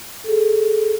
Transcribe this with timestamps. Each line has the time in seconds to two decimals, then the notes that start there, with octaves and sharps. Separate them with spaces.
0.24 G#4 A4